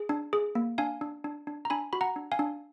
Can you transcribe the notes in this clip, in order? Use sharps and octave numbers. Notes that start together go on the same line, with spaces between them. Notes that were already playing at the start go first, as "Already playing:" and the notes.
Already playing: G#4
D4
G#4
A#3
D4 F5 G#5
D4
D4
D4
A#5
D4 G#5 B5
F#4 B5
F#5 A#5
D4
F5 G#5
D4